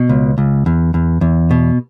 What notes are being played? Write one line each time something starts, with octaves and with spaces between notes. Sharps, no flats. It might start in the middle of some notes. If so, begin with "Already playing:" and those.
Already playing: B2
C#2
C#2
E2
E2
E2
B2